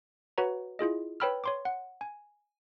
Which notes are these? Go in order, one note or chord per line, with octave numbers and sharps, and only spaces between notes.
F#4 B4 C#5 F#5 A#5
E4 F4 G#4 D#5
B4 C#5 G5 B5 E6 F6
C#5 C6 D6
F#5
G#5